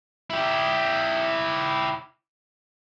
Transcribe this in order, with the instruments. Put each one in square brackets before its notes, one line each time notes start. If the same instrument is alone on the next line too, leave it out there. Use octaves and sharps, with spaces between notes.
[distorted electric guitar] E4 G4